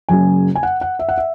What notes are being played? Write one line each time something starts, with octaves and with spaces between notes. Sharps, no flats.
F#1 F#2 C#3 G#5
G#5
F#5
F#5
E5
F#5
E5